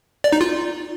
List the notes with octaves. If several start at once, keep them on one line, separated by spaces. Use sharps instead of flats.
D5
D#4
F4